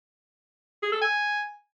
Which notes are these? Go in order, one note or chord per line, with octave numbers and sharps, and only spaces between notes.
G#4
A4
G#5